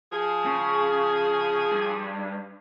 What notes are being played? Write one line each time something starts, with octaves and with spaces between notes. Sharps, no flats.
F3 G#4
C#3
G2